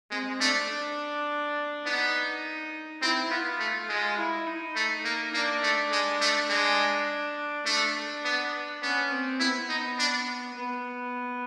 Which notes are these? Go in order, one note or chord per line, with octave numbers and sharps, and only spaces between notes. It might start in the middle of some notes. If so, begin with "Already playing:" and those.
G#3 C4
A3 D4
D4
B3 D#4
C4 E4
B3 F4
A3
G#3
E4
D#4
A3
A#3
A#3 D4
A3
G#3
A3
G#3
A3 D4
B3
B3 C#4
C4
B3 E4
D#4
D4
B3